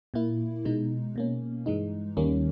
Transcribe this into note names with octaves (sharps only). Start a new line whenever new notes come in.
A#2 A#3 E4
B2 G#3 D#4
B2 A#3 C#4
G2 E3 G#3 D#4
D#2 D#3 G3 A#3 C#4